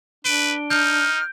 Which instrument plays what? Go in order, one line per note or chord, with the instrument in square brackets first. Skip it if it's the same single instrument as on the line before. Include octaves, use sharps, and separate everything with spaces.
[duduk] D4 [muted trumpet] B4 [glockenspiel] D7 G7
[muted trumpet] D#4 [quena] F6 [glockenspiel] G6